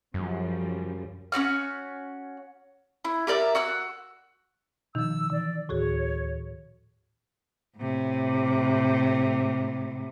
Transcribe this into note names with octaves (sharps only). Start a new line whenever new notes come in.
F#2 C#3 F3 G3
C#4 D#4 F#4 F6
E4
G4 A#4 D5 E5
F#4 E6 F#6
B2 D#3 F3 D#4 E6
E3 D5
D2 A2 D#3 F#4 G#4 C#5
A2 C3